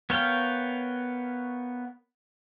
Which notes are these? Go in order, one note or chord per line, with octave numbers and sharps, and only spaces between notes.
B3 A#4 C#5 F5 G5